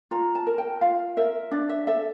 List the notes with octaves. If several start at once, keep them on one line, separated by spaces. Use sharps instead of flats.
F4 A#5
A5
A#4
G5
F4 F5
A#4 E5
D4 D5
E5
A4 E5